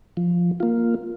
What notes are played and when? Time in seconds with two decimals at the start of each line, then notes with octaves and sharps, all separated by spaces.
0.17 F3
0.60 A#3 F4